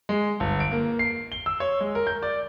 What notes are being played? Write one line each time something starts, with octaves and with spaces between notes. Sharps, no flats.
G#3
G1
D7
A#3
C7
G7
E6
C#5
G#3
A#4
G6
D5